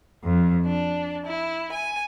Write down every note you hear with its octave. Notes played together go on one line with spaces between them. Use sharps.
F2
D4
E4
G#5